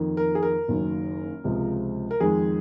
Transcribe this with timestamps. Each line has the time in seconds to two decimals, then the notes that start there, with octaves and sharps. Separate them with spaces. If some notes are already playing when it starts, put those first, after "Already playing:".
Already playing: F2 D#3 A#3
0.17 A#4
0.35 G#4
0.43 A#4
0.68 F#1 F#2 D#3 A#3
1.44 C#2 C3 F3 G#3
2.11 A#4
2.20 F2 D#3 G#3 G#4